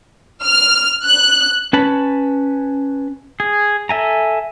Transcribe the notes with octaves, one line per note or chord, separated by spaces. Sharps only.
F6
F#6
C#4 B4 A5 B5
G#4
A4 E5 G#5 A#5